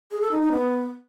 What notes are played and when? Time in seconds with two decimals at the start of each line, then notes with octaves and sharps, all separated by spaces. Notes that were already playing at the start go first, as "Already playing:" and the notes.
0.11 G#4
0.21 A4
0.31 D#4
0.41 D#4
0.52 B3